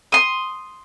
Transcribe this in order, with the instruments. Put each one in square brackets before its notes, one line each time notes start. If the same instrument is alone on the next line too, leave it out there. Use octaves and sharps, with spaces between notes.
[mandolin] C6 D#6